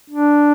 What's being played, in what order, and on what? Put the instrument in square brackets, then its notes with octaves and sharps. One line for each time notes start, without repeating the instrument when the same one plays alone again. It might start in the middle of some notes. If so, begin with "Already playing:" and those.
[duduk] D4